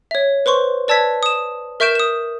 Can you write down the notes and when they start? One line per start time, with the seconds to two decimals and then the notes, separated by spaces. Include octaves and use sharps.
0.11 C#5 E5
0.46 B4 C5 C6 C#6
0.88 B4 D5 A5 E6 G#6 B6
1.23 D#6 E7
1.80 A#4 E5 C#6 G6 D7 E7
1.95 D#6 E7